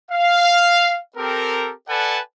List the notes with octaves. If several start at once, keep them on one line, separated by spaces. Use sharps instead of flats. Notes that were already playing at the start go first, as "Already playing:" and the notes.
F5
C4 G4 A4 A#4
A4 B4 D5 F#5 G#5 A5